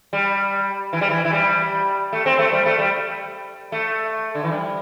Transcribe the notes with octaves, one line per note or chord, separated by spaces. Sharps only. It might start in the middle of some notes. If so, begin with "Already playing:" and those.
G3
E3
G3
E3
E3
G3
A3
C4
A3
G3
A3
G3
A3
D3
E3
G3